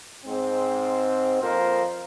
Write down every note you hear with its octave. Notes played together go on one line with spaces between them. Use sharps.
G#2 G#3 C4
F2 A#3 F4 A#4 C5